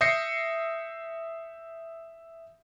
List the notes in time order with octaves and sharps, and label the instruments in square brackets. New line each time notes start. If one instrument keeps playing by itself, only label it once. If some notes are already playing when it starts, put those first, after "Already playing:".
[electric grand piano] E5 D#6 G6 A#6 C7 C#7